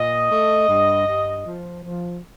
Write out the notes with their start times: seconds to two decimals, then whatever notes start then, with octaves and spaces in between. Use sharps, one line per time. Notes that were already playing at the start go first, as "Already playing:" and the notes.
Already playing: A#2 D#5
0.30 A3
0.69 G2
1.07 G2
1.46 F3
1.84 F3